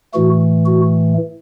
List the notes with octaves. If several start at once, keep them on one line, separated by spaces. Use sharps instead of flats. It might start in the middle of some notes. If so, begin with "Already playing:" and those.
A2 E3 A3 F#4
F#4